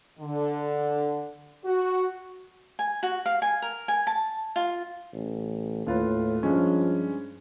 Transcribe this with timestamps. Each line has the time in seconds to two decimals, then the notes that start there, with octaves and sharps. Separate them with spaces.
0.19 D3
1.65 F#4
2.79 G#5
3.03 F#4
3.26 F5
3.42 G#5
3.62 A#4
3.88 G#5
4.07 A5
4.56 F4
5.13 A1
5.87 D#2 A2 F4 B4
6.43 G2 F3 G#3 C#4